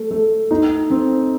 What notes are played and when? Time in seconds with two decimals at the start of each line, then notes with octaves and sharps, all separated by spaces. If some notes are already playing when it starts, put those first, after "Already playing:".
Already playing: A3
0.11 A3
0.51 D#4
0.90 C4